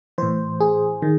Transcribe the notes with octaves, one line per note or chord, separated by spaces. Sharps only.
A2 E3 C5
G#4
D#3